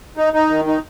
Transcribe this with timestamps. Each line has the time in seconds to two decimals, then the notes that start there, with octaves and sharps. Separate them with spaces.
0.17 D#4
0.33 D#4
0.50 D#3
0.67 D#4